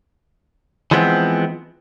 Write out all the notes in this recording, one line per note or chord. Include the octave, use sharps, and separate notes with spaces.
E3 F3 G#3 B3 C4